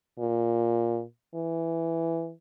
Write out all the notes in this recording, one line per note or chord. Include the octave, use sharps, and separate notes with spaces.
A#2
E3